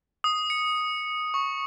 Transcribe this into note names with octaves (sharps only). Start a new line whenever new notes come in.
D#6
C#7
C#6